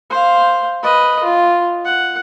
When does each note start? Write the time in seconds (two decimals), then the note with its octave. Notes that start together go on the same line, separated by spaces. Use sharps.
0.10 C5 F5
0.83 B4 D#5
1.24 F4
1.85 F#5